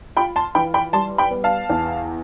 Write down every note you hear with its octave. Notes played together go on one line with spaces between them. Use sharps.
F4 G5 B5
A5 C6
E3 G5 B5
G5 B5
G3 A5 C6
G5 B5
B3
F5 A5
E2